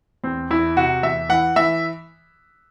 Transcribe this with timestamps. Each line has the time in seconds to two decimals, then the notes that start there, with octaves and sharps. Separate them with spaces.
0.24 E2 C4
0.51 E2 E4
0.76 C3 F#4
1.03 E2 E5
1.29 E3 F#5
1.56 E3 E5